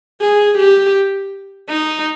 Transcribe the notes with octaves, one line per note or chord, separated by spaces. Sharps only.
G#4
G4
D#4